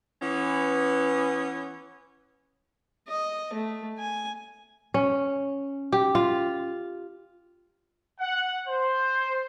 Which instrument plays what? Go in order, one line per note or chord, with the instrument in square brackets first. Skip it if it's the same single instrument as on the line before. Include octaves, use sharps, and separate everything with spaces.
[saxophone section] E3 B3 C#4
[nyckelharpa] D#5
A3
G#5
[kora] C#4
G4
F4
[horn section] F#5
C5